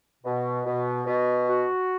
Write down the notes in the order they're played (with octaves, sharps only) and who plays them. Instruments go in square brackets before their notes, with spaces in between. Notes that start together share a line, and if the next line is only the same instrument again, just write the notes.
[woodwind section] B2
B2
B2
F#4